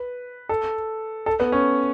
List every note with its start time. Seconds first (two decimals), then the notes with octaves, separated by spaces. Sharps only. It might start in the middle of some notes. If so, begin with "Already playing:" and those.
Already playing: B4
0.49 A4
1.26 A4
1.40 B3
1.52 C#4